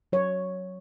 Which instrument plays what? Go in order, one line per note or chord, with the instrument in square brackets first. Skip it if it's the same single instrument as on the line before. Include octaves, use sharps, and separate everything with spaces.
[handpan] F#3 C#5